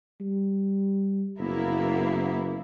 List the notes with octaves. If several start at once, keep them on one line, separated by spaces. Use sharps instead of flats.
G3
F#1 A#3 B3 E4